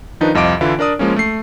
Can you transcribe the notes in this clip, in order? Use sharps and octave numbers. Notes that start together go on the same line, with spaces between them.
D#3 F3 D4 D#4 B4
C2 F2 D#5 F5 D6 D7
D3 E3 E4 F4
D4 A#4 D5 D#6
F3 G#3 A#3 C#4
A3 C7